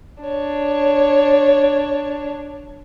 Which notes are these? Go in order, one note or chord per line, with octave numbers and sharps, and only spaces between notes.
D4 C#5